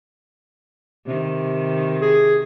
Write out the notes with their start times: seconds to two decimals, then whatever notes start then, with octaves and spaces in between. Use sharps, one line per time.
1.06 C3 D#3
2.02 G#4